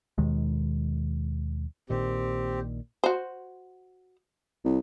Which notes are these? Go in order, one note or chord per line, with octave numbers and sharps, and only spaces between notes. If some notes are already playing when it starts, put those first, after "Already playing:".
D#2 B2 D#3 G#3
A#1 A#2 D#3 C4 G4
F#4 C5
C2